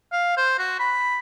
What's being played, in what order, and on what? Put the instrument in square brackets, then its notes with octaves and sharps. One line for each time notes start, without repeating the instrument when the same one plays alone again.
[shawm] F5
C5
F#4
B5